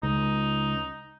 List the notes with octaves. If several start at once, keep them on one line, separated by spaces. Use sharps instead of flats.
C#2 D#4